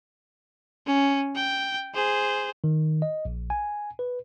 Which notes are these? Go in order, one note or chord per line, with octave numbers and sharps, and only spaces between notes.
C#4
G5
G#4 C5
D#3
D#5
A#1
G#5
B4